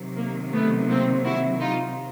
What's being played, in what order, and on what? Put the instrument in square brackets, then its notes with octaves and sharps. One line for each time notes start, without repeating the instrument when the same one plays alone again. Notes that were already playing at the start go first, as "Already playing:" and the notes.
Already playing: [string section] C3 D#3 F#3
A#3
A3 B3
A#3 C4
E4 F#4
D#4 F4